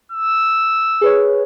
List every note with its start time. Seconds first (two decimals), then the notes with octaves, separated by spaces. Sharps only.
0.12 E6
1.01 G#4 B4 C#5